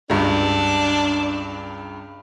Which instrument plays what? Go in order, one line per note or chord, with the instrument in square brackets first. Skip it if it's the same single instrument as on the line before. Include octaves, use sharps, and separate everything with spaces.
[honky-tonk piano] C#2 G2 [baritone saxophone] D4